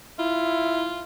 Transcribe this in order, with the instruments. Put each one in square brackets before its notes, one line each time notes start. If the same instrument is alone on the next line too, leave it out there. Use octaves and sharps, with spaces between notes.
[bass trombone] E4 [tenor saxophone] F4